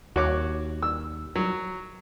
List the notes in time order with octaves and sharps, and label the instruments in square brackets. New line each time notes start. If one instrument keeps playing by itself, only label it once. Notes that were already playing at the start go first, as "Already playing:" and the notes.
[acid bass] D#2 [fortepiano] F#4 C#5 D6
[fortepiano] E6
F#3